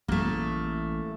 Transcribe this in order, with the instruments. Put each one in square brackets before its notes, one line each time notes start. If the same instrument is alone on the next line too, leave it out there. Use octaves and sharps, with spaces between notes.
[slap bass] A1 [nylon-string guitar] A3 A#3